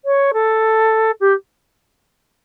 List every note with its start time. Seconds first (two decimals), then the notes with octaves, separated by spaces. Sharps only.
0.05 C#5
0.33 A4
1.20 G4